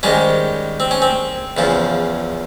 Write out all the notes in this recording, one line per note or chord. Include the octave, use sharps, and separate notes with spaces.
G#2 D#3 G3 C#4
C4
C#4
C4
E2 C#3 F3